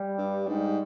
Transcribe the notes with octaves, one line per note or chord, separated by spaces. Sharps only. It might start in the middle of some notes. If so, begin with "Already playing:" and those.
Already playing: G3
G2
G#2 G3